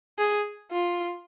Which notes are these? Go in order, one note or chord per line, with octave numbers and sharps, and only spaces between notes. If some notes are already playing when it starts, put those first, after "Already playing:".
G#4
F4